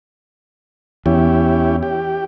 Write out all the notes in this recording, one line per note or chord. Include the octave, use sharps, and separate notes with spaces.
E2 C#4 E4 G4
G4